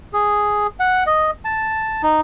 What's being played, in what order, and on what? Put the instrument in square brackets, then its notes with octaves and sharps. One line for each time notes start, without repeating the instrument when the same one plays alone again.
[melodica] G#4
F#5
D#5
A5
D#4